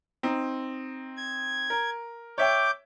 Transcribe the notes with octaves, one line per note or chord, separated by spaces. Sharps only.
C4 D#4
G#6
A#4
C#5 E5 G5 D6 G6